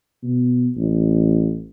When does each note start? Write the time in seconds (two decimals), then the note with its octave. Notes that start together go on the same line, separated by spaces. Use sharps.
0.23 B2
0.76 A1